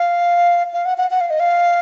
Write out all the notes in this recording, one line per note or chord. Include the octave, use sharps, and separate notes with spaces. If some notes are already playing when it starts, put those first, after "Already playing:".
Already playing: F5
F5
F#5
F#5
F#5
F5
D#5
F5